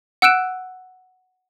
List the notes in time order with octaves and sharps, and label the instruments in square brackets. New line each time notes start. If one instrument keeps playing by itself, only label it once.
[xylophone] F#5 E6 F#6 D7 E7